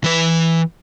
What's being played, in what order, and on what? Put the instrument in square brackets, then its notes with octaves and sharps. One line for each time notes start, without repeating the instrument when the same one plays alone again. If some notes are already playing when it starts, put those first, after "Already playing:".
[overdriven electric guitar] E3 B4